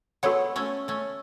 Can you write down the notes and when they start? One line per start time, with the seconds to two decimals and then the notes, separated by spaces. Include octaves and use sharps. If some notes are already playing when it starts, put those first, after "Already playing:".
0.23 G#3 B3 F#4 A4 C#5 F#5
0.56 A3 C#4
0.88 A3 C#4